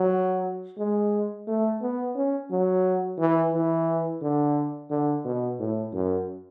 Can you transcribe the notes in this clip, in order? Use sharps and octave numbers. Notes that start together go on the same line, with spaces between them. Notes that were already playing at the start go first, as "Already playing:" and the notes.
Already playing: F#3
G#3
A3
B3
C#4
F#3
E3
E3
D3
D3
B2
A2
F#2